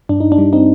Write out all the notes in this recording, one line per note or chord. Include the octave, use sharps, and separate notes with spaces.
G2 D4
D#4
D4
G3
C4 D#4